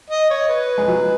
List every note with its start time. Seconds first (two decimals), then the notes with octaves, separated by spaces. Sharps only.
0.10 D#5
0.30 C#5
0.48 B4
0.78 G#3
0.88 F#3